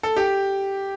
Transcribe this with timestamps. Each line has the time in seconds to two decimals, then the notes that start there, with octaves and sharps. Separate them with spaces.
0.03 A4
0.17 G4